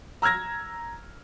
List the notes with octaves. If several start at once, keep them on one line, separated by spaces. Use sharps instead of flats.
A#5 E6 F6 G#6 A#6